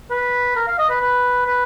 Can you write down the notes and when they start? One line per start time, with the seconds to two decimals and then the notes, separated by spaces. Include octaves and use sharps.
0.10 B4
0.56 A#4
0.67 F5
0.79 D#5
0.90 B4
1.01 B4
1.46 B4